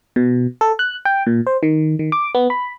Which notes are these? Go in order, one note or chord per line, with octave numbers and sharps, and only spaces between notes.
B2
A4
F#6
G5
A#2
C5
D#3
D#3
D6
B3
B5